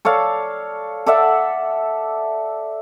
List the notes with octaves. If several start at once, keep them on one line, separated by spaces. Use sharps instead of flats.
A4 C#5 D5 F5
A4 D5 E5 F#5